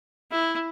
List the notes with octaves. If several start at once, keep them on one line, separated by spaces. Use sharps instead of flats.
E4